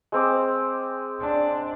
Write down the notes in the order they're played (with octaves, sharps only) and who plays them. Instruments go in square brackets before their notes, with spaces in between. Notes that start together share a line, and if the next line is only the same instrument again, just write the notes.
[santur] G#3 C4 D6
[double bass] D4